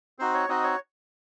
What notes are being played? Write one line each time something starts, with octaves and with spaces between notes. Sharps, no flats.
C4 D#4 F#4 C5
C#5
C4 D#4 F#4 D#5
C#5